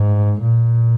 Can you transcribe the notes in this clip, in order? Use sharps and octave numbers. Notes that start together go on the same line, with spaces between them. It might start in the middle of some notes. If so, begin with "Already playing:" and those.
Already playing: G#2
A#2